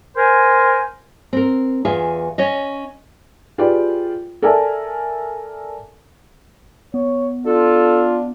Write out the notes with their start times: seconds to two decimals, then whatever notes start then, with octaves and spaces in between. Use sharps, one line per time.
0.16 A#4 C5 G#5
1.33 C4 A#4
1.85 E2 F4 G#4 E5
2.38 C#4 C#5 D#5
3.58 F4 G4 G#4 B4 D5 G5
4.42 A4 A#4 D5 E5 G#5 A5
6.94 B3 C#5
7.46 D4 F4 A4